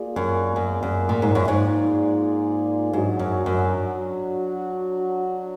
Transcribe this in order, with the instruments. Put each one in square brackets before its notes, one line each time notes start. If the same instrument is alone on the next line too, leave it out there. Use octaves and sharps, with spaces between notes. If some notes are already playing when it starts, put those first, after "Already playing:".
Already playing: [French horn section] A#3 F4 G#4 D5
[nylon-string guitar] F#2
F#2
F#2
A#2
G#2
F#2
G#2
[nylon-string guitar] G#2 [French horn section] F#3 D4 F#4
[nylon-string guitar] F#2
F#2